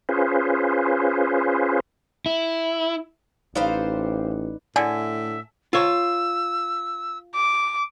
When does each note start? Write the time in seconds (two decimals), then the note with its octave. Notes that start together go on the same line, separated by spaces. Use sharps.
0.09 C#4 F4 G#4 B4 C5
2.26 E4
3.55 A1 D#4 G4 B4 C5 D5 F5
4.76 A2 D3 E5 G#5
5.73 F4 C#5 E6
7.35 D6